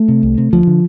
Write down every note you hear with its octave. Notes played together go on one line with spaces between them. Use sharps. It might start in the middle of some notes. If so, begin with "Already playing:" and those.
Already playing: A3
C3
C2
C3
D2 F3
D3